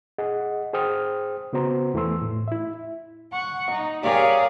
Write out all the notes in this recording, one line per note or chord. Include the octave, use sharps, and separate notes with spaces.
G#4 D#5 F#5
G#4 C5 G5 D#6 F6
C#3 B3 F#4 C5 A#5
E2 E3 A3 C6 E6
A2
E4 E5
F#5 C#6
D#4
G4 G#4 A#4 C#5 D5 F5